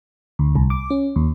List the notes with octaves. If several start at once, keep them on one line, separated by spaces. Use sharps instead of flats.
D2
C2
D6
C#4
D#2